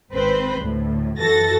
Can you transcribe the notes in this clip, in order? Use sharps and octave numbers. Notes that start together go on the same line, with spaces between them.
G#1 C4 B4 C5 B5
D2 A2
F#2 E3 F#4 A4 A6 A#6